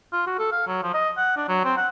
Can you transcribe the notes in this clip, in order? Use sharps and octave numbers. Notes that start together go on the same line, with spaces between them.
F4
F#4
A4
F5
F#3
F3
D#5
F#5
D4
F#3
C4
F#5